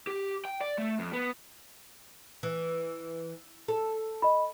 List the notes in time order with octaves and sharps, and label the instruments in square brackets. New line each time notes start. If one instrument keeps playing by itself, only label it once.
[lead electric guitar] G4
G5
D5
A3
F2
B3
[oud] E3
A4
[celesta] D#5 B5